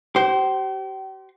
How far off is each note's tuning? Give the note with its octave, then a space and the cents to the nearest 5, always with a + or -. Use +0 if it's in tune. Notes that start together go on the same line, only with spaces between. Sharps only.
G4 -40 C5 +0